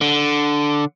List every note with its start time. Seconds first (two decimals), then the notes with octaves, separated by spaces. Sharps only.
0.01 D3